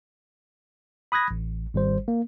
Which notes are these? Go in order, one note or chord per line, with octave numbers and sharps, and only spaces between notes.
B5 D#6 F#6 G#6 A#6
A1
G#1 G3 C5
A#3